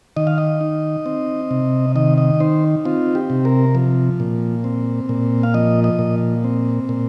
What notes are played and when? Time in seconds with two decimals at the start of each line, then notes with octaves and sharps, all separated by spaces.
0.17 D#3 D#5
0.27 F5
0.38 D#5
0.61 D#4
1.06 C4
1.51 C3
1.95 D#3 D#5
2.18 D#5
2.40 D#4 C5
2.85 C4 F4
3.15 G4
3.30 C3
3.45 A#4
3.75 F3
4.20 A#2
4.64 C4
5.09 A#2
5.43 F5
5.54 F3 D#5
5.84 D#5
5.99 A#2
6.44 C4
6.89 A#2